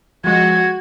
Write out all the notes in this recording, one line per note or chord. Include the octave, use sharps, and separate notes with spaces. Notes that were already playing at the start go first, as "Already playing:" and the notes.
F3 G#3 F#4 G#6